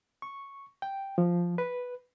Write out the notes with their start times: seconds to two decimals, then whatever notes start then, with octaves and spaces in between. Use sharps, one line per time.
0.22 C#6
0.82 G5
1.18 F3
1.58 B4